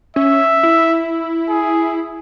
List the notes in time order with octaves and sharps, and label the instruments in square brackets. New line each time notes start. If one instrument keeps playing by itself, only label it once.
[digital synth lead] C#4 [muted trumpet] E5
[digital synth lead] E4
[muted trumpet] G#4